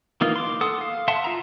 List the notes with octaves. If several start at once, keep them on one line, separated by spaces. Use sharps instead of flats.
E3 A#3 D#4 F4
C6 D6
A4 F#5 D#6
F5
E5 F#5 A5 C6
F4 E5 A#5